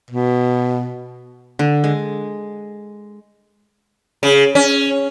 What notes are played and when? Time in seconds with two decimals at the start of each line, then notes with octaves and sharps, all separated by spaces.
0.11 B2
1.59 D3
1.84 G#3
4.23 C#3
4.55 C#4